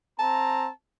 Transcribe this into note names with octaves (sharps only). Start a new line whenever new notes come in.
C4 A5 A#5